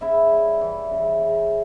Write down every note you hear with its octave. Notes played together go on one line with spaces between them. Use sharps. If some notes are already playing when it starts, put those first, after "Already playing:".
C#3 E4 E5
G3
E3
C#3
C#3